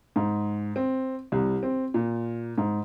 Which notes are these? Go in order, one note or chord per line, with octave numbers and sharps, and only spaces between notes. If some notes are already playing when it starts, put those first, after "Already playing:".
G#2
C4
C2
C4
A#2
G#2